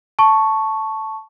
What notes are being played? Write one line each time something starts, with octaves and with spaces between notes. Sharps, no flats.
A5 C#6